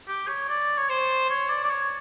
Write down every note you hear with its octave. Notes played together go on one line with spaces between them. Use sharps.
G4
C#5
D5
C#5
C5
C#5
D5
D5
C#5